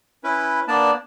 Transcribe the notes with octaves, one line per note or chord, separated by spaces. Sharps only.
C#4 E4 B4
A#3 B3 D4 D5 A5